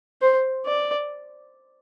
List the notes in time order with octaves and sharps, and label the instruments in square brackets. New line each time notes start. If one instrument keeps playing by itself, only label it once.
[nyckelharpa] C5
D5